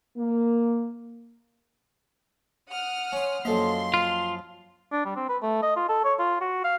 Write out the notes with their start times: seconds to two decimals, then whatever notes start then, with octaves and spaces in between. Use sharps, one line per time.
0.17 A#3
2.70 F#5 D#6 F6
3.12 C#4 C6
3.45 F#2 F3 A#3 A4 D#5 C6
3.94 F4
4.92 D4
5.05 G3
5.16 C4
5.29 B4
5.42 A3
5.62 D#5
5.76 F4
5.88 A4
6.04 C#5
6.19 F4
6.41 F#4
6.64 F5